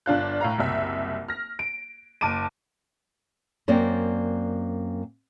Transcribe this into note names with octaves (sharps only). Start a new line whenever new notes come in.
G1 D4 F4 F#6
A2 F5 A#5
F#1 C2 E5
F6 A#6
D7
F#1 A5 D6 D7 D#7
F#2 A#3 C4 D5